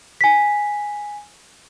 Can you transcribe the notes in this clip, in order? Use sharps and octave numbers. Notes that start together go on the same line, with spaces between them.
G#5 B6